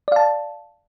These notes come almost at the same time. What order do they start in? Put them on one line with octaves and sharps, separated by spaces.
D5 F5 A5